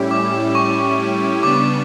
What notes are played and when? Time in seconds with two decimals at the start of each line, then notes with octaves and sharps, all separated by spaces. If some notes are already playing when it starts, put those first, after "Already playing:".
Already playing: A2 G3 C#4 E4 G4
0.11 D6
0.55 C#6
1.43 C#3 G3 B3 D4 D6